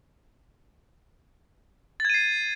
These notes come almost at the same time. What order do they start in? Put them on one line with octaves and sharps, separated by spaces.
A6 G#6 D#7 C7